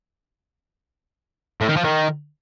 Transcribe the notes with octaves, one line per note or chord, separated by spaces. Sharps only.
A2
D#3
F3
D#3